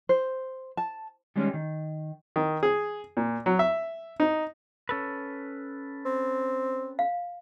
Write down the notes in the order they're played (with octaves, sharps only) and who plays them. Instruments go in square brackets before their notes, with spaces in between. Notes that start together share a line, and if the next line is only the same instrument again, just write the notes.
[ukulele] C5
A5
[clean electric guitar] D#3 G3 G#3 C#4
D#3
[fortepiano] D#3
G#4
A#2
F#3
E5
D#4
[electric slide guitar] C#4 A4 B4
[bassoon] C4
[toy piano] F5